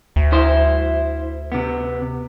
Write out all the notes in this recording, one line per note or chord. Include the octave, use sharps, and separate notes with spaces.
D2
E4 C5
C3 B3